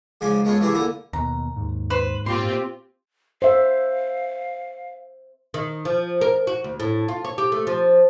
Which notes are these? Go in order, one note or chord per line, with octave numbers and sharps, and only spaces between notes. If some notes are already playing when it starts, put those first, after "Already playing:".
G#2 C#3 F3 G#5 C6 D6
G#3 A3 B3 F4 C#5
C3 E3 A3 E4 G4 G#4
A#2 D3 E4 G#5 A#5
D#2 B2 A#5
D#2 G#2
B4 C5
A#2 C4 F4 G4 C6
C5 E5 F5
D#3
F3
A#4
F#4
D2
A2
F4
C#5
G4
A3
F3